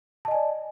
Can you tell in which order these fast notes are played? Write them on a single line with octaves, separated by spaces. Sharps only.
A5 D#5 G#5 D5